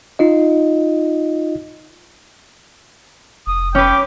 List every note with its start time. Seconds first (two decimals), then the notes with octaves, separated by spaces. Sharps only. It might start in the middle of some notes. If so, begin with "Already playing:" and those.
0.19 D#4 F4 D#5
3.47 F1 D#6
3.75 C#4 B4 G5 D6